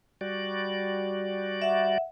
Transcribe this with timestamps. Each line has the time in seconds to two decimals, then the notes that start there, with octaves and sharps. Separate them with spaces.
0.21 G3 F#4 D5
1.62 E5 F#5